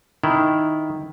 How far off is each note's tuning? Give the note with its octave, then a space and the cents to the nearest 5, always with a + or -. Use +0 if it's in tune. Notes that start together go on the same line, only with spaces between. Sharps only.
D#3 +0 E4 +0